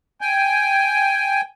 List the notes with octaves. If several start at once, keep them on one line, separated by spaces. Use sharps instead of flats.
G5 G#5